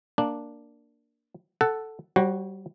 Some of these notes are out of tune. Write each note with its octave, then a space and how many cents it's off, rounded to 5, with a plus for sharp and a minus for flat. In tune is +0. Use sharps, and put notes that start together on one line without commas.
A#3 +0 D4 +0
A4 +0 F#5 +10
G3 -25 F#4 +0 C5 +35